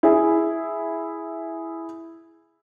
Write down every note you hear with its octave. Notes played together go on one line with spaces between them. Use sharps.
E4 G#4